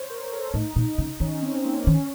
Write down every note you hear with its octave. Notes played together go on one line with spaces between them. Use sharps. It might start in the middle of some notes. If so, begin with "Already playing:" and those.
Already playing: C5 C#5
A#4
A4
A2 D#4
A#2
C#3
D#3 C#4
C4
A#3
D#3 C#4